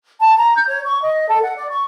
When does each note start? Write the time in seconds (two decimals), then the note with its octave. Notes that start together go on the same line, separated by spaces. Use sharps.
0.20 A5
0.37 A#5
0.56 G6
0.67 C#5
0.85 C#6
1.02 D#5
1.29 A4
1.42 F#5
1.56 D5
1.69 C#6